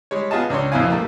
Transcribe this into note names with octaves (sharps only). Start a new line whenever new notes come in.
G3 G#3 C#5
B3 F4 G#4 D#5 A5
C#2 D4 C#5 C6
A#1 F2 B2 E4 F5 G#5
G3 A3 A#3